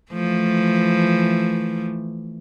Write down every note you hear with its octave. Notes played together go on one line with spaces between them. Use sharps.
E3 F3 A3